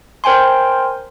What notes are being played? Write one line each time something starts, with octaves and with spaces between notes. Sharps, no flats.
A#4 C5 G5 G#5 C6